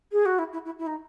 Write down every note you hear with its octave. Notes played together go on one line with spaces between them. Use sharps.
G#4
F#4
E4
E4
E4
E4
D#4